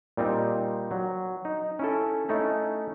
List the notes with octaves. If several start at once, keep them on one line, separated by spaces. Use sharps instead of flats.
A#2 G3 C4 D#4
F#3
D#4
C#4 E4 A4
A3 C#4 D#4 E4